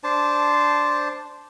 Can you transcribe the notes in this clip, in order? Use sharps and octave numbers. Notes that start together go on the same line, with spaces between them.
D4 C5 A5